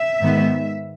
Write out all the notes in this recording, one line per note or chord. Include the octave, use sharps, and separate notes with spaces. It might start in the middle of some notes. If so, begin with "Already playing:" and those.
Already playing: E5
G#2 D#3 G#3 B3